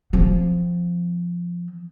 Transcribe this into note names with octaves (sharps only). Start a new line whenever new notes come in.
F3 C4